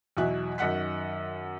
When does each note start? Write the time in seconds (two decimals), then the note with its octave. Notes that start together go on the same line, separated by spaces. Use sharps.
0.17 E2 B2 F#3 E5 F#6
0.58 F#2 D#3 F#5 F#6 B6